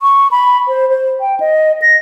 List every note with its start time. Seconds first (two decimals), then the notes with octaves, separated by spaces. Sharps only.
0.02 C#6
0.31 B5
0.68 C5
0.90 C5
1.20 G5
1.40 D#5
1.82 A#6